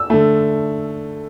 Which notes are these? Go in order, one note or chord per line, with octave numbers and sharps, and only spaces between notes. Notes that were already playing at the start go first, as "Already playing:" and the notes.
Already playing: E6
D3 A3